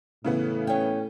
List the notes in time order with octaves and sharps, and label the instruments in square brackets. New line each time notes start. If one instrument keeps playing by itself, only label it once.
[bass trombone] A2 [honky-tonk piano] C#3 E3 B3
[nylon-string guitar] C#4 G5